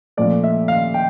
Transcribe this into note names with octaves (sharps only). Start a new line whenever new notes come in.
A#2 F3 A3 D5
E5
F5
G5